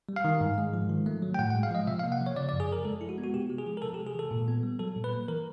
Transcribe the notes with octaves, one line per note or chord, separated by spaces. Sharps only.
G3
F5
D#3
G#2
G#3
F3
D#3
A3
F#3
G5
A2 F#5
F#5
G#3
F5
F3 D#5
C3 E5
F5
A#3
F#5
F3
C#5
C#3 D5
D5
F#2
G#4
F3 A#4
G#3 A4
E4
F#4
B3
F#4
C3 G4
G#3
G#4
F3
A#4
C3 A4
G4
G#3
G#4
E3 A4
A#2
B3
G3
F#3 A4
A#2
B4
A#3
E3 A#4